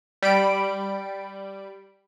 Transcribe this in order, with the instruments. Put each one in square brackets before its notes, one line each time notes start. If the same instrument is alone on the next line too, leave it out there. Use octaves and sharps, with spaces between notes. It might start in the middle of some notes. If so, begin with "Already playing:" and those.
[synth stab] G3 B5 D7